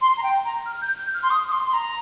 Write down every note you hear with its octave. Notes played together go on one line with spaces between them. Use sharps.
C6
A#5
G5
A#5
F6
G6
G6
F6
C6
D#6
D#6
C6
C6
A#5